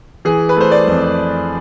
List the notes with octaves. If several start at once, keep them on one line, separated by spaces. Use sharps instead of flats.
E3 G#4
B4
A3 C5
D5
F2